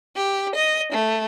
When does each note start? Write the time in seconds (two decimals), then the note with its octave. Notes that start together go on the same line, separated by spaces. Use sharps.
0.17 G4
0.56 D#5
0.92 A3